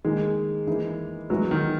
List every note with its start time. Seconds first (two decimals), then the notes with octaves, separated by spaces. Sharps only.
0.05 D#3 G#3 A#3 D#4 G#4
0.67 E3 A#3 D#4 G#4
1.30 E3 F#3 G#3 B3 D#4 G#4
1.51 D#3